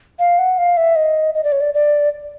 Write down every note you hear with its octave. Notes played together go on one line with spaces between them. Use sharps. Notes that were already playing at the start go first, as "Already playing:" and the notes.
F5
F#5
F5
E5
D#5
D#5
D5
C#5
D5
D5